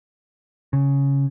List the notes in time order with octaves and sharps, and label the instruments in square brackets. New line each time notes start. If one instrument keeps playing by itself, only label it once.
[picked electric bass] C#3